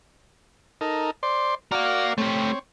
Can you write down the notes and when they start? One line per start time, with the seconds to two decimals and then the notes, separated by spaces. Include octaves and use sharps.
0.81 D#4 A4 A#4
1.23 C5 D5 C6
1.72 F#4 A#4 D5 F5 F6
2.18 A3 C4 G4 C#5